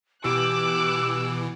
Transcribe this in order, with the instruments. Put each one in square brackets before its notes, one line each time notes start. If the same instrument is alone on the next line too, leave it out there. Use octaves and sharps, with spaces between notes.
[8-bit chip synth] B2 E3 [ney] G4 [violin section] D6 F#6 [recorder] E6